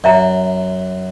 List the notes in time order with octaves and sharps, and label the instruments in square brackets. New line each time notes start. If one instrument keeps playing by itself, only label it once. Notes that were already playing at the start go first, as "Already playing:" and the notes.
[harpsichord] F#2 [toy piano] D5 E5 A#5